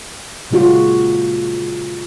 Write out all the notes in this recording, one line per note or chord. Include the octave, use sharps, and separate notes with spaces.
A#2 C#3 G#3 F4 F#4